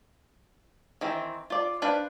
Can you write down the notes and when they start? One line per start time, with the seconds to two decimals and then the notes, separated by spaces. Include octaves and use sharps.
1.01 D#3 E3 C4
1.50 F4 D5
1.82 D4 B4 C5 F5